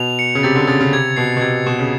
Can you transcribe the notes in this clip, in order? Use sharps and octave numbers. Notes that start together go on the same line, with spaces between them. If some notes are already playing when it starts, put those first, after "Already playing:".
Already playing: B2 F7
C#7
C#3
C3 A6
D3
C#3 A6
C#3
C3 G#6
B2 C7
B2
C3 G#6
B2 E7
C#3